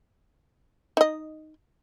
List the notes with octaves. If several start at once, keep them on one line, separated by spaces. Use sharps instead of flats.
D#4 D#5